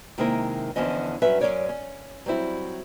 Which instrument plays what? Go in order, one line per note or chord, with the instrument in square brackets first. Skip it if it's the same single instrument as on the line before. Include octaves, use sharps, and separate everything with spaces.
[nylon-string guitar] C3 D#3 G#3 A#3 E4 A#4
E2 D3 F3 C#4 D#5
G2 F#3 C#4 B4 E5
F#2 D#3 C#4 A#4 C#5 D5
C#4
F#3 G3 C4 E4